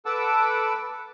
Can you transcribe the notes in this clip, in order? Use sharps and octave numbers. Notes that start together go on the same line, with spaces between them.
A4 B4 F#5 A5 D6 E6